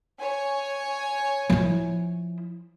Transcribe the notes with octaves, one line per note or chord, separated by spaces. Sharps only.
C#5 G#5
F3 E4